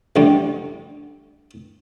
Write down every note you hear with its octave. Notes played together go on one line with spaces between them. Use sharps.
A1 D3 G3